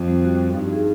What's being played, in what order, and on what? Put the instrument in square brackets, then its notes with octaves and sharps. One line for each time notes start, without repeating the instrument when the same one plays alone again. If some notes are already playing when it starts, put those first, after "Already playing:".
Already playing: [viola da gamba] F2
[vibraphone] G3
F#4
F#4
[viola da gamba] G2 [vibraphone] D#4
[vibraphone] G#4